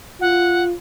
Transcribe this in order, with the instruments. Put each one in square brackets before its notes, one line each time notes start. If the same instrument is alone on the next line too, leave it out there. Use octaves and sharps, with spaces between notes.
[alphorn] F4 [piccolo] F#5